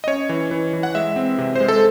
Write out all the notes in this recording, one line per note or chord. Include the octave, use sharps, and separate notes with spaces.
D#5
C#4 C#5
E3
E3
E3
F#5
G#3 E5
C4
C3
C5
G#3
A4